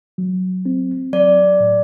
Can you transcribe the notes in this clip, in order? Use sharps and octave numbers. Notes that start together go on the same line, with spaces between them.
F#3
C4
F#3 D5
A2